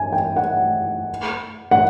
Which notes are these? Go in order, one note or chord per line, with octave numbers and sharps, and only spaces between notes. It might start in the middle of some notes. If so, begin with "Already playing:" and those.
Already playing: G#5
G5
F#5
F#5